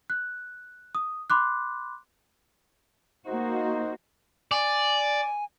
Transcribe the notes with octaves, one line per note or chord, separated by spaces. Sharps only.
F#6
D#6
B5 C6 D6 F#6
A#3 D#4 F#4 C5
D5 G#5